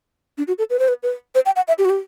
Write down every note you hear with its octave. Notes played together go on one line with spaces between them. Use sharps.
D4
F#4
A4
B4
C5
B4
B4
C5
G5
F#5
E5
G4
F#4
G4